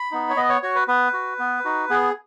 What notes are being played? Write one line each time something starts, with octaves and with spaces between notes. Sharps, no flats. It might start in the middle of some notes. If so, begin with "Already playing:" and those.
Already playing: B5
B3 D#4
C#5
B3 D#5
C#5
F#4 C#5
B4
B3 B4
F#4
B3
D#4 F#4
B3 G#4